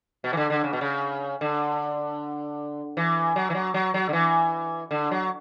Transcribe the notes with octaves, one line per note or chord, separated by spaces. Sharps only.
B2
E3
D3
D3
C#3
B2
C#3
D3
E3
F#3
E3
F#3
F#3
F#3
D3
E3
D3
F#3